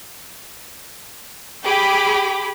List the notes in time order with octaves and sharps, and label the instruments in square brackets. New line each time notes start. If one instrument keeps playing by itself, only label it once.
[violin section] G4 G#4 B5 D6